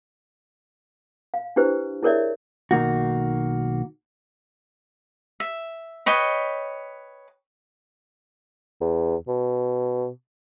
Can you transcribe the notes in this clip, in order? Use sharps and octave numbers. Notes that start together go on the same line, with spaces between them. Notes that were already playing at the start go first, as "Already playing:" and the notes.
F5
D4 E4 G4 B4 C5
E4 G#4 A#4 C#5 D5 E5
B1 D#3 A#3 F#4
E5
B4 C#5 D#5 G5
E2
B2